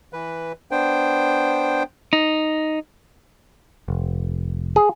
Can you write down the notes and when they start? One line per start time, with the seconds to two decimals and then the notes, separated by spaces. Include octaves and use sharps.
0.13 E3 B4
0.71 B3 D4 C5 G5
2.13 D#4
3.88 F1
4.76 G#4